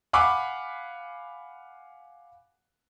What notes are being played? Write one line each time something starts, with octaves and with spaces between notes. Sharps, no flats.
F5 F#5 G#5 B5 D6